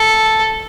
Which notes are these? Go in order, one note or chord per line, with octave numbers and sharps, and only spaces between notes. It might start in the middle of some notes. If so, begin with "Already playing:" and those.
Already playing: A4